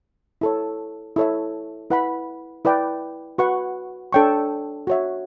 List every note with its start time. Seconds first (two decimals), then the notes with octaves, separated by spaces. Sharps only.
0.41 E4 A4 C#5
1.16 E4 A4 C#5 E5
1.90 E4 B4 F#5 B5
2.65 E4 B4 D5 G5
3.38 F#4 B4 F#5 C#6
4.13 D4 A4 C#5 G5 C#6
4.87 F#4 C#5 E5